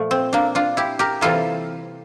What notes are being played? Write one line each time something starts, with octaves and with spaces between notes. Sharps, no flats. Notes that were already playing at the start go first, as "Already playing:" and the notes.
Already playing: A#2 F3 A3
C4
A#3 D4
D4 F4
E4 G4
G4 A#4
C3 E3 G3 A#3 F4 A4